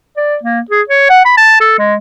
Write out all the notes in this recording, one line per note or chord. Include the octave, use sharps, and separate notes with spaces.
D5
A#3
G#4
C#5
F#5
B5
A5
A4
G#3